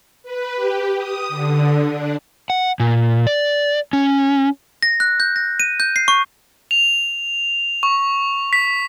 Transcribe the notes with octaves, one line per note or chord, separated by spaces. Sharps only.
B4
G4
D#6
D3
D4
F#5
A#2
D5
C#4
A#6
F#6
G6
A#6
D#7
G6
C7
C#6
F7
C#6
B6